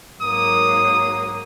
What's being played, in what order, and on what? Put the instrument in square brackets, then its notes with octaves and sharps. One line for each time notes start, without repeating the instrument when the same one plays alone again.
[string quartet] G#2 F#3 A#3 [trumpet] D#6